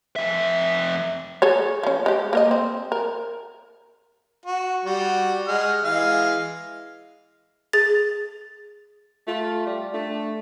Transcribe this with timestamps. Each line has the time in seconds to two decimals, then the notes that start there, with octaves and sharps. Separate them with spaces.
0.16 F2 E5
1.42 G#4 A4 C#5
1.83 F3 C#4
2.06 G#3 G4
2.33 A#3 A#4 D#5
2.51 C4
2.92 A#4
4.46 F#4
4.85 G3 F#4
5.47 G#3 F#5 F6
5.84 E3 G#3 F5
7.73 G#4 A6
9.27 A3 F4
9.66 G3
9.94 A3 D4